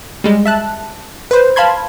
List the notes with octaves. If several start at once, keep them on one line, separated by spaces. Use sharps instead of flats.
G3 G#3
E5 A5 F#6
B4 C5
F5 A5 B5 C6 G#6